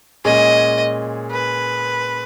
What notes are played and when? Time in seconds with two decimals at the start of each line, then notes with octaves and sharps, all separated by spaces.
0.25 A#2 G#3 C#4 G#4 D#5
1.31 B4